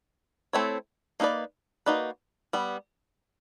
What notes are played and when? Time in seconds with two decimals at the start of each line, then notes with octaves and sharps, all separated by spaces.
0.53 A3 C4 E4 A4 C#5
1.20 A#3 D#4 F#4 B4 D5
1.86 A#3 D#4 F#4 B4 D5
2.53 G3 B3